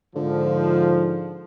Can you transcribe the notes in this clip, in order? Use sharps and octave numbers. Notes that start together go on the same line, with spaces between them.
G#2 D3 F3